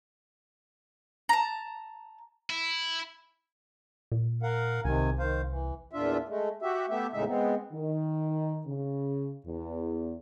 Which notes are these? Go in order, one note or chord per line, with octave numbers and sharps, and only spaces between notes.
A5 A#5
E4
A#2
A#4 F5 F#5
C2 C3 D#3 G#5
D#3 C5 F5
E3
E2 A#2 D4 F4 E5
G#3 A3
F#4 G4 E5
A3 B3 G4 E5
E2 A2 C#3 G#3 D#4 E5
G#3 B3 C4
D#3
C#3
E2